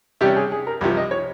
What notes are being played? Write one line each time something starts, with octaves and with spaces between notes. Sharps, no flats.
C3 G3 C#4 G4
G#4
G#4
A#4
C2 C3 F3
D#5
C#5